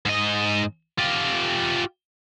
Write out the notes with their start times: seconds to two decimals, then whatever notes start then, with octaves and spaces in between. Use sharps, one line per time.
0.06 G#2 D#5
0.98 F4 G4